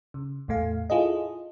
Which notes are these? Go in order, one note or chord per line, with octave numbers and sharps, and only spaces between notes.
C#3
E2 A2 A3 F5
E4 F4 G#4 A4 D#5